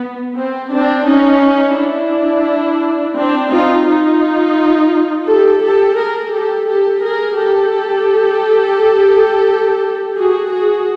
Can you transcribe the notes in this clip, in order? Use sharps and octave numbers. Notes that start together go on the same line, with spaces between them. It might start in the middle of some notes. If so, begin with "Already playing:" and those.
Already playing: B3
C4
C4 D4
C#4 D#4
D4 E4
C4 D4
D#4 F4
D#4 F4
G4 A4
G4 A4
G#4 A#4
G4 A4
G4 A4
G#4 A#4
G4 A4
F#4 G#4
F#4 G#4